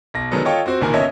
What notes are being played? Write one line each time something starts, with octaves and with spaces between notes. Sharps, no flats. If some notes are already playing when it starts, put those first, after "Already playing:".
B1 A#6
D3 D#3 F#3 G#3 B3 A4
F4 A4 C#5 D#5 G5 C#6
C4 F#4 C5
F#1 A#2 D#3 F#4 A#4 G#5
G1 C#4 C#5 D#5 E5